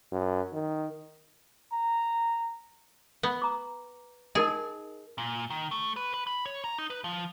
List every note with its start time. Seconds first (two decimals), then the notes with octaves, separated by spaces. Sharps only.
0.12 F#2
0.53 D#3
1.72 A#5
3.23 B3
3.42 A#5 D6
4.35 D#4 G#4 A#4 D#5
5.18 A#2
5.50 D#3
5.71 A3
5.96 B4
6.14 B4
6.27 B5
6.46 C#5
6.64 A#5
6.78 D#4
6.90 B4
7.04 F3